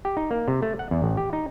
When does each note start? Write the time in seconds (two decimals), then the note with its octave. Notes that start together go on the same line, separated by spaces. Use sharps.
0.05 G4
0.17 D#4
0.31 A#3
0.48 C3
0.62 A3
0.79 F#5
0.91 E2
1.02 A1
1.17 G4
1.33 D#4